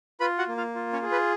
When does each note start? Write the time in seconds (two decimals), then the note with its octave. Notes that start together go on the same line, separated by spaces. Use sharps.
0.20 F4 B4 B5
0.38 F#4 F#5
0.48 A#3
0.57 F4 F5
0.75 F4
0.93 C#4 C#5
1.02 G#4
1.12 B4